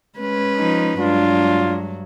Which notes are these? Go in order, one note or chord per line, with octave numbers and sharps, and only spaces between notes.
G#3 C#4 B4
F3 D#4
G2 F#3 G#3 D4 F4